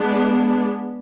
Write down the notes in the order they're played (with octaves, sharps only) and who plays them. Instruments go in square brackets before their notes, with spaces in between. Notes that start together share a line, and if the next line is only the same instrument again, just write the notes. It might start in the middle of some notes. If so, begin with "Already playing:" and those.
Already playing: [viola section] G#3 B3 D4